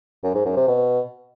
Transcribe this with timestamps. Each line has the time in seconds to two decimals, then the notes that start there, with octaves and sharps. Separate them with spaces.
0.24 F#2
0.34 G#2
0.45 F#2
0.56 C3
0.67 B2